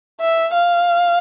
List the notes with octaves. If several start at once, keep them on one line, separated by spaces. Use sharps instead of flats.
E5
F5